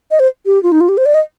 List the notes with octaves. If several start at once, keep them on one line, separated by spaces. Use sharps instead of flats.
D#5
C5
G4
F4
D#4
F4
G4
C5
D5
D#5